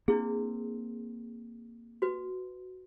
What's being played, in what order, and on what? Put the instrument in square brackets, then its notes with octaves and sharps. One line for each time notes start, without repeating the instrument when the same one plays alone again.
[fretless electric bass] A#3 C4 [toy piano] D4 E4 G#4
[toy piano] F#4 B4